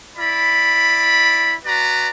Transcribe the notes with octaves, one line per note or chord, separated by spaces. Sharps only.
E4 D5 B5
F#4 B4 D5 A#5